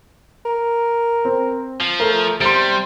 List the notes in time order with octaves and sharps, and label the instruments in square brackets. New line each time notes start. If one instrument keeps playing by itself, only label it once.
[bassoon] A#4
[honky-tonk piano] C4
[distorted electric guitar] F3
[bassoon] A3 [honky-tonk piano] A#4
[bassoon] C3 [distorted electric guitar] G3 [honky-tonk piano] C6 D7